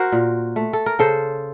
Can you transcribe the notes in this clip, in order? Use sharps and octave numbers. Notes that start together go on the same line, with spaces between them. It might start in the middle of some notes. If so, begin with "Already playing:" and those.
Already playing: F#4 A#4 C5
A#2
A3
A4
A#4
C#3 A4 C5